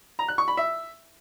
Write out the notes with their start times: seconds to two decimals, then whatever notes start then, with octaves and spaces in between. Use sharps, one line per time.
0.19 A#5
0.28 F#6
0.38 C#6
0.48 B5
0.57 E5